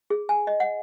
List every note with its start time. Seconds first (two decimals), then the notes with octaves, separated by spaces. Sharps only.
0.10 G#4
0.29 G#5
0.47 D#5
0.60 F#5